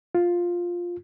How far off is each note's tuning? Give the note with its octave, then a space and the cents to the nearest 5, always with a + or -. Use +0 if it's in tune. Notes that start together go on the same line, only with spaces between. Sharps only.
F4 +5